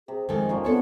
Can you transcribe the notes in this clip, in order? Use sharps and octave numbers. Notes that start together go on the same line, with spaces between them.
C3 G#4
F2 D#3 G#3 A4 G#5
D#3 F3 A#3 C#4
B3 C4 D4 A4 C#5